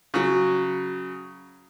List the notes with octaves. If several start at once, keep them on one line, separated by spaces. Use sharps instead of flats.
C#3 F#3